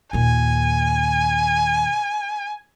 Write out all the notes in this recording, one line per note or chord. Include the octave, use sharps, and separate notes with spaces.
D#2 A#2 G#5